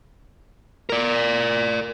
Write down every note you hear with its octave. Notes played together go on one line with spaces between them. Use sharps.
A#4 D5